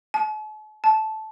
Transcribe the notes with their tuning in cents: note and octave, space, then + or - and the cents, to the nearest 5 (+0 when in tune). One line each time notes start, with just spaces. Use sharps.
A5 -45
A5 -10